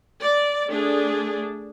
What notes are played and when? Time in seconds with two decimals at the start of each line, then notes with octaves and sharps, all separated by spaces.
0.20 D5
0.69 A3 D4 G#4